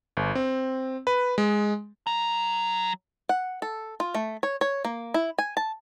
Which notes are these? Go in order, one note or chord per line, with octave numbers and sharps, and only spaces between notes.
G1
C4
B4
G#3
F#3 A#5
F#5
A4
F4
A3
C#5
C#5
A#3
E4
G#5
A5